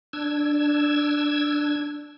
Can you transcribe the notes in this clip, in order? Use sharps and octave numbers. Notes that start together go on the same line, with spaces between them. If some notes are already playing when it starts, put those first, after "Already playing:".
D4 E6 G#6